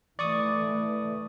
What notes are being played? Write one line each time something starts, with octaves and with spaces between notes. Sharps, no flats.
E3 A3 D5 C#6 D#6